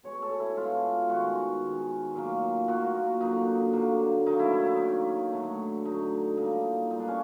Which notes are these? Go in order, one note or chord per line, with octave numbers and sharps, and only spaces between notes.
B2 G#3 C#5
A4
E4
B2 G#3 F4
D#3 G#3 F#4
D#3 G#3
A#2 F#3 A#3
A#2 F#3 A#3 F#4
D3 F#3 A#3 D#4
D3 F#3 A#3
D#3 F#3 A#3 D#4
E4
E4
D#4
D#3 F#3 A#3
D3 F#3 A3
D3 F#3 A3 D#4
A#2 G3 A#3 D#4
A#2 G3 A#3 D#4
D4
C#4